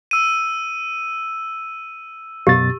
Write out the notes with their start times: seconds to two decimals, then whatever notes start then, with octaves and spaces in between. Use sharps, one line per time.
0.11 E6 D#7
2.47 F#2 B2 G4 A6